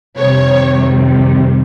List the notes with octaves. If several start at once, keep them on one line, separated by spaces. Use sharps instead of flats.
F2 C3 D#3 G3 C#5